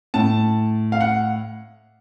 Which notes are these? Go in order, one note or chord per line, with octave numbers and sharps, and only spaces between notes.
A2 A5
F5
F#5